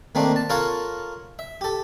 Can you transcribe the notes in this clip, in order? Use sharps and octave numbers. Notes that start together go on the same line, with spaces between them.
D#3 A3 A#3 C4 D4
A5
F4 A4 A#4 C#5 F5 F#5
E5
G4 A4